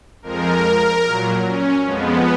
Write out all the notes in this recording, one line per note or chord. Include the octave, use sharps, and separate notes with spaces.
F2 F3 G#3 A#4
A#2 F#3
C#4
F2 F3 G#3 B3